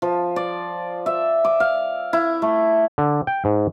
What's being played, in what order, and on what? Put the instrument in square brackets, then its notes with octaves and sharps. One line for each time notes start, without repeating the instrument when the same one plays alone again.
[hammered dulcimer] F3
D5
E5
D6
F5
E4
A3
[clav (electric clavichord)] D3
G5
G#2